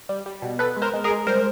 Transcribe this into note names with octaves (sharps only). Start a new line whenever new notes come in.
G3
G3
B2
B3 A4 B4
G#3
A#4 C5
G#3
G#4 A#4
G#3
G3 A#4 C5